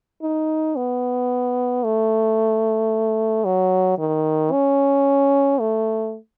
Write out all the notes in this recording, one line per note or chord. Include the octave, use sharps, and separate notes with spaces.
D#4
B3
A3
F#3
D#3
C#4
A3